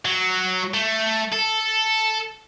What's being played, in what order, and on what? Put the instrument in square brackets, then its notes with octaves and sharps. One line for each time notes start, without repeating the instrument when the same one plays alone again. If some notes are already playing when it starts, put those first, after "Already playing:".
[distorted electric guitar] F#3
A3
A4